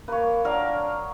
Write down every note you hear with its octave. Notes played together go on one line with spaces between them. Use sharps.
A#3 B4 C#5
F#3 D4 A#4 F5